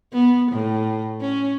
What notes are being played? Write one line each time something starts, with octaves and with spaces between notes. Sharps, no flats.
B3
A2
C#4